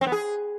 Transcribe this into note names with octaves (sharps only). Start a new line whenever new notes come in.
C4
B3
G#4